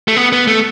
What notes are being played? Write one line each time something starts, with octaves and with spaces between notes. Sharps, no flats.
A3
B3
B3
A3